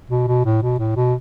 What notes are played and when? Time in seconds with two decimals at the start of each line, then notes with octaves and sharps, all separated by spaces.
0.10 B2
0.28 B2
0.45 A2
0.62 B2
0.79 A2
0.96 B2